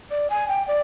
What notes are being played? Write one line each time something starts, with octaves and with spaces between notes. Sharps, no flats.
D5
G#5
G5
D5